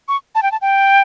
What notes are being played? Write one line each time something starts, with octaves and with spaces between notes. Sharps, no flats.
C#6
A5
G5
A5
G5